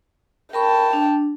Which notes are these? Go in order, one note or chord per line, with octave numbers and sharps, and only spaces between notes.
A#4 G5 A5 B5 C#6
D4